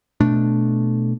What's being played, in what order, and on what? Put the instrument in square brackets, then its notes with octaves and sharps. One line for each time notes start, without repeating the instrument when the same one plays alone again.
[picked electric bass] B2 A3 D4